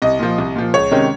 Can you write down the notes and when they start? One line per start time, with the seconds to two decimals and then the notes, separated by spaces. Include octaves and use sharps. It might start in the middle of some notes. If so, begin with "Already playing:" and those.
0.02 C2 D#5
0.19 A#2 F3
0.38 C2
0.56 A#2 F3
0.74 C#2 C#5
0.91 C3 D#3 G#3 C#4